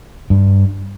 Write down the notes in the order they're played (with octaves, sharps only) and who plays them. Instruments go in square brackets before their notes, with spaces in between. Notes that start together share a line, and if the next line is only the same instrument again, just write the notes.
[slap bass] G2